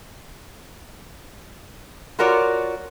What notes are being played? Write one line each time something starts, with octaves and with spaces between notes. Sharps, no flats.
F4 F#4 A#4 C#5 D5